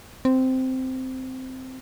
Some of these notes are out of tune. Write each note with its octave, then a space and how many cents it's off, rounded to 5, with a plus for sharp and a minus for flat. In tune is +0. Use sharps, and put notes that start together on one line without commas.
C4 -10